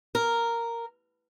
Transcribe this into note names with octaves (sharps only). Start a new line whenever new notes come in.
A#4